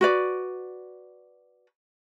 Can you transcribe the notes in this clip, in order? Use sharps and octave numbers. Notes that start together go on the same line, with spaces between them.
F#4 B4 D5